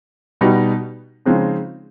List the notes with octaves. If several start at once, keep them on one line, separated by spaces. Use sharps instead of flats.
B2 G3 B3 D#4
C#3 F3 G#3 C4 D#4